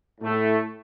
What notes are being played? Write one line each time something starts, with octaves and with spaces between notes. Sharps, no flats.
A2 A3